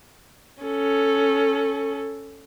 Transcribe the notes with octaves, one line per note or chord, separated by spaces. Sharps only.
C#4 A4